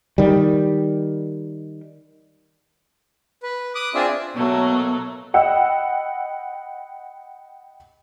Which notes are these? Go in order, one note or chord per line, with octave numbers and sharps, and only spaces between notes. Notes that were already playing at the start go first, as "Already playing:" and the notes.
D#3 G3
B4
D6 D#6 F#6
C4 D4 F4 G#4 D5 E5
B2 F#3 A3 A#3
D#5 F#5 G5 B5 E6